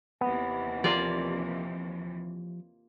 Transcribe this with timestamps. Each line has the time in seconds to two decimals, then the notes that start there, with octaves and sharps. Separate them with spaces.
0.21 D#2 C3 E3 B3
0.84 F3 A#3 F4 G4 A#4 D5